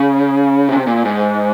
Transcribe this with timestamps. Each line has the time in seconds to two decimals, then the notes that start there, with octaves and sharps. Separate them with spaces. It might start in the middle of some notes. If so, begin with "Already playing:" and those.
Already playing: C#3
0.69 C3
0.87 A#2
1.05 G#2